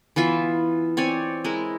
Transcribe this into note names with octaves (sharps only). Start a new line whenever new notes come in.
E3 B3 F4 E5
C4 C#5 D5 G#5
G#3 E4 A#4